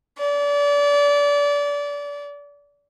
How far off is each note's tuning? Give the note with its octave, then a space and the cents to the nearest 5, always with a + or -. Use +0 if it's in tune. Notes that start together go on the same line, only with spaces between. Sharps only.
D5 -30